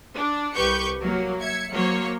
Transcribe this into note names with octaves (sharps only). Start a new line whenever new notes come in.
D4
C2 G4 B4 C#6 G6 C#7
F#3 A#3
E5 G#6 C#7
F#3 A#3 C5 C#5